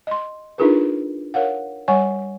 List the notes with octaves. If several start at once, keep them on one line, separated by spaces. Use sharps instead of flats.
D#5 C6
D4 D#4 F4 G#4 A#4 B4
A#4 C#5 F5 F#5
G3 C#5 F#5 G#5 C#6